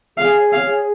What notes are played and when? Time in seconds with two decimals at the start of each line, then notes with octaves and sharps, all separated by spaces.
0.17 G#4 F5
0.41 C#5
0.53 F5
0.63 G#4